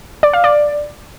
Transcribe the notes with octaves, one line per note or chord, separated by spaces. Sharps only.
D5
F5
D5